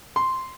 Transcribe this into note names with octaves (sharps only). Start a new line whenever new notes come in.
C6